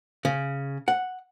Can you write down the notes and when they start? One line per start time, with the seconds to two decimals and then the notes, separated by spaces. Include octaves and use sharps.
0.25 C#3
0.88 F#5